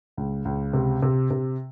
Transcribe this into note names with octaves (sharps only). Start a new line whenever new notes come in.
C#2
C#2
C3
C3
C3